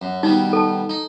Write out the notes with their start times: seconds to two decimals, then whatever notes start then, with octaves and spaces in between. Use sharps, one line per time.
0.02 F#2
0.23 B2 D#3 G3 D#4
0.53 A4 A5
0.89 D#4